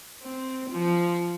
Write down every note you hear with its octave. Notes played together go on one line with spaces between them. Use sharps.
C4
F3